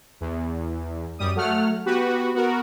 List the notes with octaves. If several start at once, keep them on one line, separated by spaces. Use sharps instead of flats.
E2
F#2 G3 D#6
F#3 A3 F#5 F6
B3 F#4 G4 B4
B3 F#4 A#4